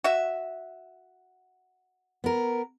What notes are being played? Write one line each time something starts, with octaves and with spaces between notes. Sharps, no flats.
F#4 E5
B3 A#4